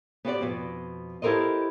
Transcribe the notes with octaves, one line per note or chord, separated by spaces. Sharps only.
B3 C4 F#4 G4 C5 D5
F2 B2
E4 G4 A4 A#4 C5 D#5